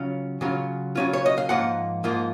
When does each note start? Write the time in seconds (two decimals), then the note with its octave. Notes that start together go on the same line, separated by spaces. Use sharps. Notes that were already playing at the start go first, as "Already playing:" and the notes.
Already playing: C#3 F#3 C#4 F4
0.41 C#3 F#3 C#4 F4
0.95 C#3 F#3 C#4 F4
1.13 C#5
1.26 D#5
1.38 F5
1.49 G#2 F3 A#3 F4 F#5
2.04 G#2 F3 A#3 F4